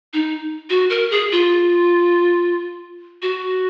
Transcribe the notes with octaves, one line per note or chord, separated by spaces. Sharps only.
D#4
F#4
A#4
G#4
F4
F#4